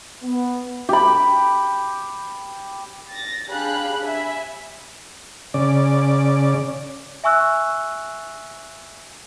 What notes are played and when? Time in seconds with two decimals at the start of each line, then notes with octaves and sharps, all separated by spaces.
0.22 B3
0.89 G4 B5
3.10 A6 A#6
3.50 D4 G4 G#4 F5 B5 F#6
4.02 E5 G#5 B5
5.54 C#3 D5
7.24 E5 G#5 C#6 E6 F#6